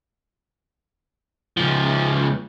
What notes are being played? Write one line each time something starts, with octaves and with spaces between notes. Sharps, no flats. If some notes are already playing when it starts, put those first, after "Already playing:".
C#2 F3